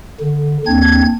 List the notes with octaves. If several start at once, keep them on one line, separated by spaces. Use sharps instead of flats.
D3
D#2 C4 D4 G#6